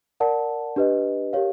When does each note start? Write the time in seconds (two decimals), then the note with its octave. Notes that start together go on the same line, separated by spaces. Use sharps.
0.20 A#4 D5 F#5 A5
0.76 D4 G4 B4 D#5
1.33 G4 A#4 C#5 F5